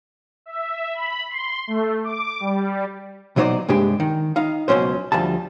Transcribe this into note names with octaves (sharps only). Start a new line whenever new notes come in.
E5
B5
C6
A3
D6
G3
B1 B2 F#3 D#4 C5 D5
G2 C3 G#3 D4 G4
D#3
D#4 F5
C#2 B2 D#3 F#3 C#4 C5
D2 F3 G3 A5